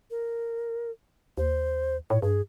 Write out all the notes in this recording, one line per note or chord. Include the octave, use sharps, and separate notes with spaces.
A#4
D#2 C5
A2 C#5
G2 G#4